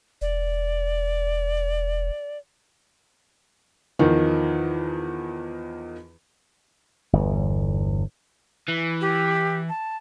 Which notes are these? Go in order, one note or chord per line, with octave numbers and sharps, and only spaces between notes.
E1 D5
E2 D#3 F3
G1 E2
E3
G4
A5